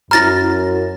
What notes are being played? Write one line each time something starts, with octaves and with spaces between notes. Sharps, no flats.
F#2 E4 A#5 F6 A6 A#6